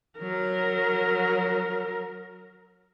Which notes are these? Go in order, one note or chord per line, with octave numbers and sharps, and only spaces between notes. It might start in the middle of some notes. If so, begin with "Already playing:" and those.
F#3 A#4